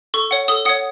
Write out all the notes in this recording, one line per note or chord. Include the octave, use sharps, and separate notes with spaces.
A4 C#6
C#5 F#5
A4 D#6
C#5 F#5 D#6